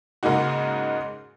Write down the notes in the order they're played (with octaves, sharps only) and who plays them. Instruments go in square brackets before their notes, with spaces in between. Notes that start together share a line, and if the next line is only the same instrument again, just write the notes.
[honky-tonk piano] G#2 C#3 G#3 A#3 D#4 F#4